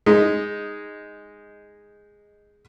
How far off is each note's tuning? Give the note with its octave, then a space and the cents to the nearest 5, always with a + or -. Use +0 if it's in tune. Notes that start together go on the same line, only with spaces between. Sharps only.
G#3 -10 D#4 +0